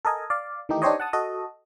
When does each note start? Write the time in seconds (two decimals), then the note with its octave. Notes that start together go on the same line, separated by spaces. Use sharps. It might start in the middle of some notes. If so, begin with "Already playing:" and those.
0.05 A4 A#4 D#5 G#5
0.30 D5 F5
0.69 D#3 E3 A3 D#4 G4
0.82 D4 D#4 G4 C5 C#5 D#5
1.00 F#5 A5 D#6
1.13 F#4 A4 D#5